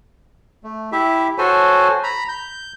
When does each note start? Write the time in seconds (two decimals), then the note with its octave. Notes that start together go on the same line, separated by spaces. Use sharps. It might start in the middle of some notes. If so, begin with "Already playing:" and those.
0.64 A3
0.92 E4 G4 E5
1.38 F#4 A4 C5 C#5 G#5
2.03 A#5 B5
2.29 G6